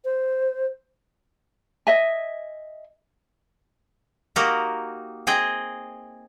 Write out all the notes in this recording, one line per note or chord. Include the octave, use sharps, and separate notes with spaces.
C5
D#5 E5 G#5
A#3 D#4 F#4 G4 A#4
C4 G#4 D#5 G5